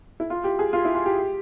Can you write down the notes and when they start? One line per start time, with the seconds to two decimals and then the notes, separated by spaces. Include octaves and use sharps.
0.20 E4
0.30 F4
0.44 G4
0.59 G#4
0.73 F4
0.85 E4
0.95 F4
1.06 G4